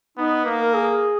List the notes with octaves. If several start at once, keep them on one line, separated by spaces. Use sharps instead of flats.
B3 D#4
A#3
A#4
G#4